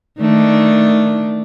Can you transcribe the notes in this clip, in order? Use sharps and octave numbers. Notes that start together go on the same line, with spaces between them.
D#3 A3 D4